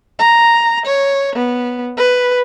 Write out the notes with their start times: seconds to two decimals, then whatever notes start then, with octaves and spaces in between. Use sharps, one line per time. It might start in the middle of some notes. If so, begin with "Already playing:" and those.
0.19 A#5
0.86 C#5
1.36 B3
1.97 B4